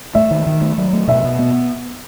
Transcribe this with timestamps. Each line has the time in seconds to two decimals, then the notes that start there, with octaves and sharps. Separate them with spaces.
0.15 A3 E5
0.31 D#3
0.46 D#3
0.62 A3
0.78 F#3
0.93 A3
1.08 B2 E5
1.24 B2
1.39 B3